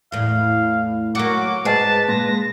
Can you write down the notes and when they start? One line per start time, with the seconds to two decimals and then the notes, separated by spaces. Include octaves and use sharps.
0.12 E2 A2 F5
1.15 F#3 A#3 F#4 D6
1.65 G#2 G#4 B4 D#5 G#5 A5
2.08 A#2 G#3 A#6